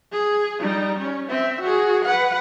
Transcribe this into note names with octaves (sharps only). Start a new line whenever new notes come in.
G#4
G3 D#4
C#4
C4 E5
F#4 G#4
B4 F#5